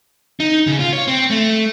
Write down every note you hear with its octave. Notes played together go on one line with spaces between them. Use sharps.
D#4
C#3
F4
C#5
C4
A3